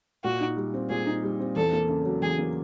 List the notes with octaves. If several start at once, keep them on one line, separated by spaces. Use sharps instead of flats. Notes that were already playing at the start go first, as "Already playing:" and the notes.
A#2 F#4
D#4
G3
C4
A#2 G#4
D#4
G3
C4
E2 A4
A#3
C#3
F#3
E2 G#4
A#3